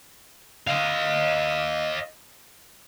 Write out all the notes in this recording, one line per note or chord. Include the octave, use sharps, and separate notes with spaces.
D#5 F5